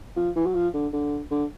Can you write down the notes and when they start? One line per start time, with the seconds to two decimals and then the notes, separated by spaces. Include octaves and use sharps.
0.16 F3
0.35 E3
0.46 F#3
0.54 F3
0.74 D3
0.93 D3
1.31 D3